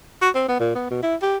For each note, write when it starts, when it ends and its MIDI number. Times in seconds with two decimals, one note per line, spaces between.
0.22 0.30 66
0.35 0.47 60
0.48 0.57 59
0.60 0.72 46
0.75 0.90 59
0.91 1.02 47
1.03 1.15 64
1.22 1.37 67